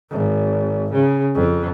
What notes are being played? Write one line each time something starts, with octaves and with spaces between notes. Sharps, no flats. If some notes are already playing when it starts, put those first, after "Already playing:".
G#1
C#3
F2